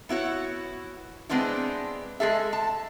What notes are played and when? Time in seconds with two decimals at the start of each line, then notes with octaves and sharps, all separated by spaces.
0.09 B3 E4 F#4 C#5
1.29 G#3 B3 C4 D4 E4
2.20 G#3 G#4 A4 E5
2.53 A5